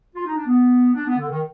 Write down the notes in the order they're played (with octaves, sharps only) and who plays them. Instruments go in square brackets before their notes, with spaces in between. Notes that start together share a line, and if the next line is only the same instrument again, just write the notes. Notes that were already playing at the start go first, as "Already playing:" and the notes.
[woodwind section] F4
D#4
D4
B3
D4
B3
D3
D#3